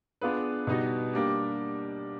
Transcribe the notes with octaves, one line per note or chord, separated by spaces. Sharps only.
B3 D4 F4 G#4 B4
B2 G3 B3 D#4 F#4
G3 A#3 D4 G4